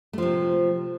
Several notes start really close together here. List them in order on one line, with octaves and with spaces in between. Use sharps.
A3 F3 C3